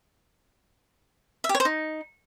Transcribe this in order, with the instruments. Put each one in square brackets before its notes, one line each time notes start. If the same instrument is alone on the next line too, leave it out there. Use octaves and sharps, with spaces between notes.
[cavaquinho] E5
G4
C#5
C5
D#4